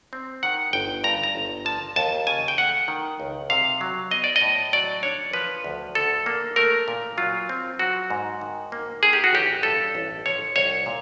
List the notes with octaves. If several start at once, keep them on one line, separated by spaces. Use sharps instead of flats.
C4
D#3 F#5
G1 G5
G2 A#5
A#5
G1
F3 A5
D#2 A5
C#3 G#5
G5
A3 F#5
D#3
C#2
C3 F5
F#3
B3 D#5
D5
D#5
A2
F#3 D5
D4 C#5
F3 B4
D2
D3 A4
A#3
A3 A#4
A#2
F#3 F4
C4
F#3 F#4
G#2
D#3
A#3
D#3 G#4
G4
F#4
A1 G4
G2 A4
A1
F3 C#5
C2 C#5
A#2